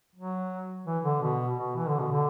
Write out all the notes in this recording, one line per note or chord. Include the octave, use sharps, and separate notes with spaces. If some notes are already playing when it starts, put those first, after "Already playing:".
F#3
E3
D3
B2
B2
E3
D3
B2
D3